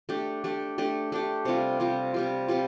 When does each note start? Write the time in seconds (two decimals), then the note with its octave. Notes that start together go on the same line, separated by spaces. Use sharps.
0.09 A3 D4 G4
0.44 A3 D4 G4
0.78 A3 D4 G4
1.12 A3 D4 G4
1.45 C3 G3 F4
1.80 C3 G3 F4
2.14 C3 G3 F4
2.48 C3 G3 F4